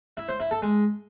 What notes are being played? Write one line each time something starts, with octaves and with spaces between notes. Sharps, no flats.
E4
C5
E4
A4
G#3